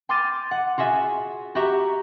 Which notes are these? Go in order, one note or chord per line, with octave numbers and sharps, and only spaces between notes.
G5 C6 D6 F6 A6 D#7
F#5
F4 F#4 G#4 E5
F#4 G4 E5 A#5 C#6